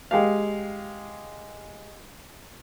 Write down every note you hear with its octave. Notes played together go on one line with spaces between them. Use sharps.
G#3 G4 F5